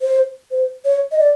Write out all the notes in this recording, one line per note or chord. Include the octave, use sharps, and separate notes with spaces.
C5
C5
C#5
D#5
D5